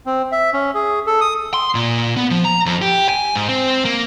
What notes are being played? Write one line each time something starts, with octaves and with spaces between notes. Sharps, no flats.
C4
E5
C#4
G#4
A4
D#6
C6
A#2
B3
F3
A#5
F2
G4
G#5
G#2
C4
A#3